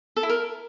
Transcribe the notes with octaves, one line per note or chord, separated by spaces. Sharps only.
A4
E4
A#4